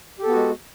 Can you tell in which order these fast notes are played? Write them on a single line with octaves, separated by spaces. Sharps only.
G4 A4 B3 F#4 G#3